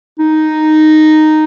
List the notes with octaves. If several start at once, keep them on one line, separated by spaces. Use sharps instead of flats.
D#4